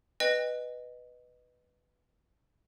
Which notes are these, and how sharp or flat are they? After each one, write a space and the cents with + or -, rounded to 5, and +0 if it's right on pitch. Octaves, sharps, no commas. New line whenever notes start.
B4 +0 D#5 -10 G5 +35